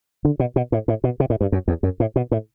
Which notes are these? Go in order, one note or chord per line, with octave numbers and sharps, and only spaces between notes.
D3
B2
B2
A2
A2
B2
C3
A2
G2
F#2
E2
F#2
A2
B2
A2